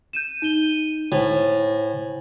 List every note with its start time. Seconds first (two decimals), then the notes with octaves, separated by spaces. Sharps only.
0.13 G6 D#7 E7
0.42 D#4 D#7 G7
1.12 A2 E4 C5 G#5